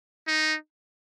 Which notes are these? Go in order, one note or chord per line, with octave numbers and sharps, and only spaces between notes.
D#4